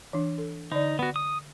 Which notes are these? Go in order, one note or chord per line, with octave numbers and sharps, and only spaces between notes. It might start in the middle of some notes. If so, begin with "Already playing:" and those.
E3 D4
A4
D3 D#4 D5
B3 F#4
D#6